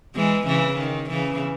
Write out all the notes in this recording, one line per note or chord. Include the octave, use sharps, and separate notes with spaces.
E3 G#3
C#3 E3
D#3
C#3 E3